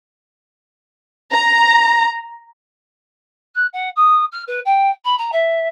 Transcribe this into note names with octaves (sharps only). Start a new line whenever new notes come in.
A#5
F#6
F#5
D#6
F6
B4
G5
B5
A#5
E5